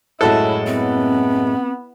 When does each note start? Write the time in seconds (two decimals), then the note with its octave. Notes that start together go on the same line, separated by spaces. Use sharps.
0.21 F#2 A2 G#3 E4 F#4 A4
0.67 B3 C4